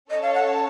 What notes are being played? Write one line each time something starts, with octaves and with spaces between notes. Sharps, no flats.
C#4 A4 C#5 D#5 A5
F5
F#5